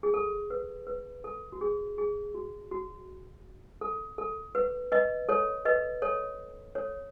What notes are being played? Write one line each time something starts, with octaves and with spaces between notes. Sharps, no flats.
G#4
A4
B4
B4
A4
F#4
G#4
G#4
F#4
F#4
A4
A4
B4
B4 D#5
A4 C#5
B4 D#5
A4 C#5
A4 C#5